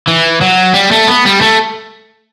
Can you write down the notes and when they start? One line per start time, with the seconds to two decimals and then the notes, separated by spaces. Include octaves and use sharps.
0.07 E3
0.41 F#3
0.74 G3
0.92 A3
1.08 B3
1.26 G3
1.42 A3